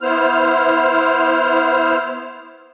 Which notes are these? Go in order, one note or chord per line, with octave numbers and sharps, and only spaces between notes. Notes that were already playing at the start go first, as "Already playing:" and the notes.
B3 E4 C5 F6